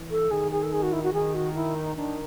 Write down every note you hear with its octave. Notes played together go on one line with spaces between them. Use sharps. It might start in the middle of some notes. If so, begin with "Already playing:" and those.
Already playing: E3
A4
D#3 G#4
G#4
A4
G#4
F#4
E4
F#4
D#3 G#4
F#4
E4
D#4
D#3 D4